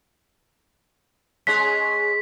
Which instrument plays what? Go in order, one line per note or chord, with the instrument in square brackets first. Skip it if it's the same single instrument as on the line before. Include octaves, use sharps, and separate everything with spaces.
[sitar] G#3 C#4 G#4 [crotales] B6